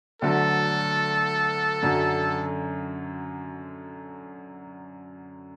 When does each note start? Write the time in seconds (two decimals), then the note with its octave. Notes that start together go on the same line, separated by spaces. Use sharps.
0.22 D2 D3 F#3 A4
1.82 F#2 D3 F#3